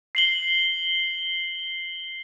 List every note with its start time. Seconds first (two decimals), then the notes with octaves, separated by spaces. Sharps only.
0.15 C7 F#7 G7